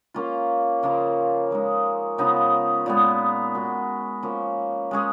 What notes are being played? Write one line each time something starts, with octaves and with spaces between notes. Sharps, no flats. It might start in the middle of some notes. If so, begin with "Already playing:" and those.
A#3 C#4 F4
C#3 F3 A#3 F4
F3 G#3 D#4
C#3 F3 B3 D#4
A#2 G#3 B3
G#3 B3 F#4
F3 A#3 C#4
G#3 C#4 G#4